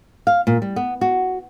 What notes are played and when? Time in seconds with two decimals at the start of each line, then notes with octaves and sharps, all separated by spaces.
0.27 F5
0.47 A#2
0.62 G3
0.76 B3
1.01 F#4